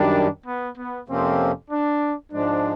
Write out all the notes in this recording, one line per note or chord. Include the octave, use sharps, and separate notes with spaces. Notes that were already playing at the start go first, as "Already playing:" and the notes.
Already playing: F#2 D#3 G3 D4
B3
B3
F2 C3 F3 A#3 C4 C#4
D4
G#2 F3 G#3 D4